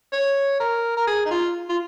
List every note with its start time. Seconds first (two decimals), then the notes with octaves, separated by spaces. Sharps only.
0.13 C#5
0.60 A#4
0.97 A#4
1.07 G#4
1.26 D#4
1.31 F4
1.69 F4